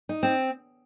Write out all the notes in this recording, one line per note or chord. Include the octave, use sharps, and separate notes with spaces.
D#4
C4